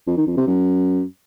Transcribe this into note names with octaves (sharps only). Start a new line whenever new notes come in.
F2
D#3
F2
C3
F#2